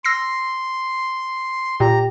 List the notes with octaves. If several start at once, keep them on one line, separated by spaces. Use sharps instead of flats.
C6 E6 A#6 C7
A#2 G4 A#5